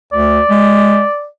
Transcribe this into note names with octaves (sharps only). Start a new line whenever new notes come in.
D2 D5
G#3